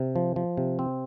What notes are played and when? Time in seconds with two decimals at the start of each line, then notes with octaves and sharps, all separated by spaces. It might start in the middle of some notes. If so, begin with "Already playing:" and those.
Already playing: C3
0.16 F3
0.36 F3
0.57 C3
0.79 C4